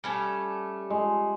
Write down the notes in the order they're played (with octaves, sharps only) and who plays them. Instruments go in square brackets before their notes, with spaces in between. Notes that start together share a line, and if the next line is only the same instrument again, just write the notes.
[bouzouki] G3 A3 C#4
[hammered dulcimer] G#3